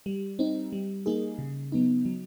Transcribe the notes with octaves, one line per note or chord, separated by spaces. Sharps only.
G3
C4 D#4
G3
A#3 D#4 G#4
C#3
F#3 B3 D#4
F#3